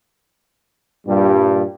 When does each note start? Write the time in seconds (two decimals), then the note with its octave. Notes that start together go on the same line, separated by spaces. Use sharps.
1.07 G2 A#2 G3